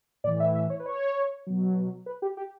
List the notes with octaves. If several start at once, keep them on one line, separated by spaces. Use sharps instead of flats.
A2 E3 D5
E5
E5
C#5
B4
C#5
B2 F#3
B4
G4
G4